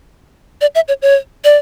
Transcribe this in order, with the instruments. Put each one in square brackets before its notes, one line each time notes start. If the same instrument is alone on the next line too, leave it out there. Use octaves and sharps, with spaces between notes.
[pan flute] D5
E5
C#5
C#5
D5